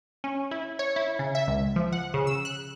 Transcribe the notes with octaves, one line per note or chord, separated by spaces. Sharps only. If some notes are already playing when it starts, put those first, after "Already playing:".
C#4
E4
C#5
E4
C#3
E5
C#2
F3
F#5
C#3
E6
F#6